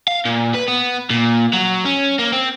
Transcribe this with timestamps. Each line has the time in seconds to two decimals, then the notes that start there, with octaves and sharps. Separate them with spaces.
0.08 F5
0.25 A#2
0.54 B4
0.68 B3
1.10 A#2
1.53 F#3
1.85 C#4
2.19 A#3
2.32 C4